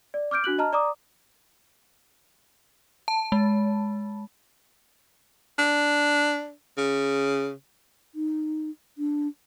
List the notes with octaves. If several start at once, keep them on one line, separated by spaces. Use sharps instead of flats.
D5
D6 F6 G6 D7
D4 F#4 F#6 F#7
D#5 A5 A#5 F6
D5 A#5 D6 D#6
A5
G#3
D4
C#3
D#4
D4